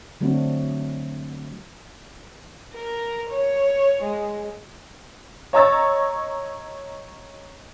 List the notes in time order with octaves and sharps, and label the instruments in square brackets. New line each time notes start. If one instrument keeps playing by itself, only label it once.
[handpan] D3 F#3 A3 C4 D4 F#4
[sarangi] A#4
C#5
G#3
[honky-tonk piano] C#5 D#5 A#5 C#6 E6 A6